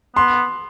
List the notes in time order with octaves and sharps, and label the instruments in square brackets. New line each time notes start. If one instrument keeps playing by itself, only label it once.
[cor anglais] B3 [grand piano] C6